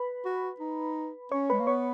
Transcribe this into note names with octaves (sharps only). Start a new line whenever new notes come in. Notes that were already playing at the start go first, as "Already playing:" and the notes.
Already playing: B4 B5
F#4
D#4
C#4 C#5 C#6
G#3 B4 B5
A#3
B3 C#5 C#6